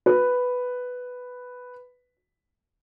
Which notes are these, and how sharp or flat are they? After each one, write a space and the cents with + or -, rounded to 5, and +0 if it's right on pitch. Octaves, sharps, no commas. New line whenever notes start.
B4 +5